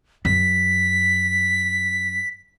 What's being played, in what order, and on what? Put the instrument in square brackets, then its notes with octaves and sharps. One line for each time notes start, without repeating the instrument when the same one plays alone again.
[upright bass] F#2 [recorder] B6